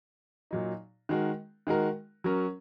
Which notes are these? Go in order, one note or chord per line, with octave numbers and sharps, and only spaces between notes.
A#2 F#3 D#4
D#3 G#3 F#4 A#4
D#3 G#3 F#4 A#4
F#3 C#4 A#4